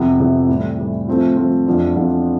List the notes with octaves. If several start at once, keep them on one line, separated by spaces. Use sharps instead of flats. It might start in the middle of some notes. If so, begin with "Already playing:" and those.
Already playing: F2 C3 E3 B3
F2 C3 E3 B3
A2 E3 G3
A2 E3 G3
F3 A3 C4 F4
F3 A3 C4 F4
F2 E3 B3 D4 F4
F2 E3 B3 D4 F4